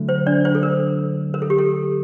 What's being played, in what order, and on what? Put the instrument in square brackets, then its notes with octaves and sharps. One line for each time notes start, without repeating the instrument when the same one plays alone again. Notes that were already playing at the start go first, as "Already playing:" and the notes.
Already playing: [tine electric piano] D3 F#3 A3
[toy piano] C5
D4 D5
C5
A4
A#4
A#4
A4
G4
A4